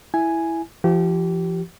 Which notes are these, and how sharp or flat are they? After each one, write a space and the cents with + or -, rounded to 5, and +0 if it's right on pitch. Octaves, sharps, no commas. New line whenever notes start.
E4 +0 G#5 +0
F3 -45 G4 -30